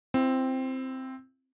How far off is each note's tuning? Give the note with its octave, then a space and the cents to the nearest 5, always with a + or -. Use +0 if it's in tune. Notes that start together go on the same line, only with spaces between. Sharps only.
C4 +0 E4 +40